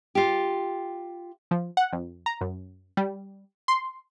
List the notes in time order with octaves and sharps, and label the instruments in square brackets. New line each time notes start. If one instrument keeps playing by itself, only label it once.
[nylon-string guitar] F4 G4
[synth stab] F3
F#5
F2
A#5
F#2
G3
C6